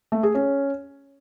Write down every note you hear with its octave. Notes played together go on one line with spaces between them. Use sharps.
A3
G#4
C#4